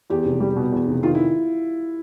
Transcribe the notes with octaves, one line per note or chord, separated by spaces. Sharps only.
E2 G4
F1
G3
B2
E2
F1
D#3 F4
E4